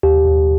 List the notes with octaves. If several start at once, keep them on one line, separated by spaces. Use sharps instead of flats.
D#2 G4
D#2